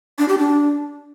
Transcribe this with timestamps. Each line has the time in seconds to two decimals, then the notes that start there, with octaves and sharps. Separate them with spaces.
0.18 D4
0.28 G4
0.38 D4